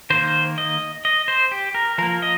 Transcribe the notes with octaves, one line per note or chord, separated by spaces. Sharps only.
D#3 A#3 C5
D#5
D#5
C5
G4
A#4
F3 A#3 A#4
D#5